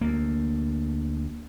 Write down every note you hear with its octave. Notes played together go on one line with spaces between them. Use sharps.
D2 A#3